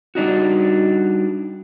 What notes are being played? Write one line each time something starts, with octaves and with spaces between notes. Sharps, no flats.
G3 D4 D#4 F#4